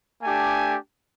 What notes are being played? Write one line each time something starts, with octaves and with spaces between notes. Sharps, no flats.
A3 D4 G4 G#5